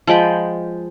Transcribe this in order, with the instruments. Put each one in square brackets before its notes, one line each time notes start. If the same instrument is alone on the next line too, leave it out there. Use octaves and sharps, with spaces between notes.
[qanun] F3 G#3 G5 B5